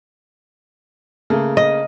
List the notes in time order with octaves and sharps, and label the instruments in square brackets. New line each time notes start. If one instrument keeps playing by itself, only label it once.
[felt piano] C#3 A3 A#3
[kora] D#5